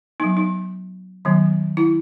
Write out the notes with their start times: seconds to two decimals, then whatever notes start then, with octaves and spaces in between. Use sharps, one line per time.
0.20 B3 D#4
0.23 F#3
0.37 D#4
1.25 D#3 F#3 B3
1.77 E4